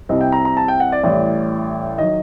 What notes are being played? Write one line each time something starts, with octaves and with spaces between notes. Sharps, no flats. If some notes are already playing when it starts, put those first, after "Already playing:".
C2 C3 G3 C4 D#5
G5
A#5
A#5
A5
G5
F#5
D5
A1 A2 G3 D5
D#3 F#3 D#5